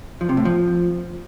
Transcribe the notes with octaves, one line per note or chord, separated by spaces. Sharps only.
F3
C3
A2
F3